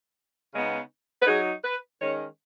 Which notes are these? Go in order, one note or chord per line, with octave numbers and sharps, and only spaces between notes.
C#3 G#3 B3 D#4
B4
F#3 D#4 G#4
B4
D#3 G#3 C#4 C#5